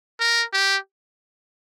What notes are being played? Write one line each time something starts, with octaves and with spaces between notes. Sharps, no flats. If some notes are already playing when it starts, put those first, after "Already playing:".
A#4
G4